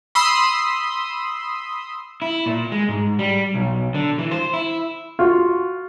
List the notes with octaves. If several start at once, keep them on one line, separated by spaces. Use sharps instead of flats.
B5 C6 D#6 E6
E4
A#2
G#3
G#2
G3
B1
D3
E3
C5
E4
F4 F#4